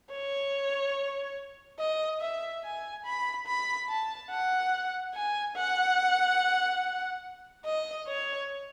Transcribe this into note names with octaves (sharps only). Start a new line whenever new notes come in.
C#5
D#5
E5
G#5
B5
B5
A5
F#5
G#5
F#5
D#5
C#5